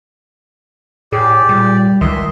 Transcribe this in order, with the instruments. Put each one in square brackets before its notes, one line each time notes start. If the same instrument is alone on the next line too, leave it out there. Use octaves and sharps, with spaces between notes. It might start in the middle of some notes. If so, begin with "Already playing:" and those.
[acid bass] A2 [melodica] G4 D5 [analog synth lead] G#4
[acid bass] A#2 [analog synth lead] G3
[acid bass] C#2 [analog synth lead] D#3 [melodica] D#5 E5 C6